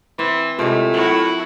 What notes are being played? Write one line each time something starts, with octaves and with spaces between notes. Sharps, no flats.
E3 C4
A2 C3 G#3 F4 A#4 E5
F#3 E4 F#4